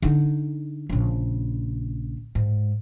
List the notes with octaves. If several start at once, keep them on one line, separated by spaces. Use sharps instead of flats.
D3 D#4
A#1 C#3
G#2